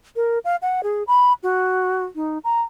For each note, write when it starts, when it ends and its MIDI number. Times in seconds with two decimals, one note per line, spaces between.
0.16 0.39 70
0.45 0.56 77
0.62 0.81 78
0.83 1.03 68
1.07 1.33 83
1.43 2.05 66
2.15 2.38 63
2.44 2.62 82